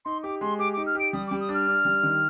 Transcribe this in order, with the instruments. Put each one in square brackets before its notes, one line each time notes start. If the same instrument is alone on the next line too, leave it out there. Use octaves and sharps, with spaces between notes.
[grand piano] D#4 [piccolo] C6
[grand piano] G4 [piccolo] D6
[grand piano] G#3 [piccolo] C6
[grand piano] G4 [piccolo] D6
[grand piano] D#4 [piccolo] D6
[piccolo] F6
[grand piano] G4 [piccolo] D7
[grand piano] G3 [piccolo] D#6
[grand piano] G3 [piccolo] D6
[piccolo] D#6
[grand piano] D4
[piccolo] F6
[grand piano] D4
G3
D#3